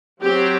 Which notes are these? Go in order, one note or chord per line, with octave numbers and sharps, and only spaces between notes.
F#3 C4 G4